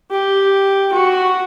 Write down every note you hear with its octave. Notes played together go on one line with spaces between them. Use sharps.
G4
F#4